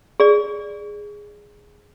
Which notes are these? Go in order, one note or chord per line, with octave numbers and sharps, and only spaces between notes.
G#4 D5